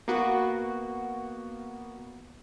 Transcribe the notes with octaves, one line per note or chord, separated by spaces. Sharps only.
A#3 B3 F#4